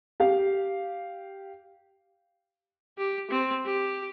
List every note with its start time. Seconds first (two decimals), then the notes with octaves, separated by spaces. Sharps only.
0.20 G4 F5
2.98 G4
3.31 C4
3.65 G4